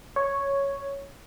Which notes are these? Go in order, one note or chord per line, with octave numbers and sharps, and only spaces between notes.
C#5